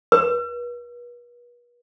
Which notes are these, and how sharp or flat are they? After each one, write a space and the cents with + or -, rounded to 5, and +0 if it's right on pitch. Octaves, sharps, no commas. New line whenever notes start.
B4 -40